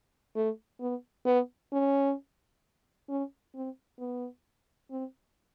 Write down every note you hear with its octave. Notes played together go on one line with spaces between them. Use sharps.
A3
B3
B3
C#4
C#4
C4
B3
C4